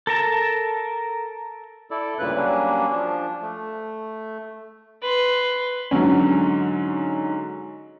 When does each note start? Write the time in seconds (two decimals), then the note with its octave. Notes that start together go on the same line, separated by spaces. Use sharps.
0.07 A4 A#4 A5
1.91 E4 A4 D5
2.19 D2 G2 A#2 C#3 B4 F#6
2.36 F#3 G3 A#3 C#4 D4
2.91 F3 D4
3.42 A3
5.02 B4 C6
5.91 G#2 D3 F#3 C#4